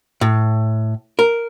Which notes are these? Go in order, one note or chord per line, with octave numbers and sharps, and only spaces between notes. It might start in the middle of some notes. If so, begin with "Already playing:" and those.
A2
A#4